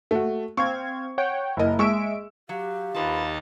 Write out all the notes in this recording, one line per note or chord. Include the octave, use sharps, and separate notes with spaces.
A3 F#4
C4 F5 C#6 G#6
C#5 F#5 G5
F#1 E4 A#4 D#5
G#3 E5 C#6 E6 D7
F#3 G4 F5
D#2 D#4 F4 B4 A5